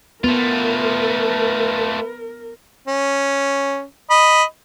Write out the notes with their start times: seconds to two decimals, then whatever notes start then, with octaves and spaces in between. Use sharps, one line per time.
0.24 A3 B3 F4 A#4 B4
2.88 C#4
4.10 D#5 B5